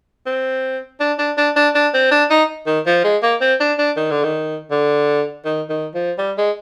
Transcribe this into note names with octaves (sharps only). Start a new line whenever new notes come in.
C4
D4
D4
D4
D4
D4
C4
D4
D#4
D#3
F3
G#3
A#3
C4
D4
D4
D#3
D3
D#3
D3
D#3
D#3
F3
G3
G#3